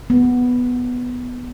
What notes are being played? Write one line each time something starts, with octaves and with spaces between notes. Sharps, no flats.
B3